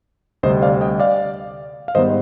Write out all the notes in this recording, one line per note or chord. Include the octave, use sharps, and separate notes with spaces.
D2 C3 G3 C4 C5 D#5
D5 F5
D#5 G5
D5 F5
F5
G#2 D#3 G3 B3 C5 D#5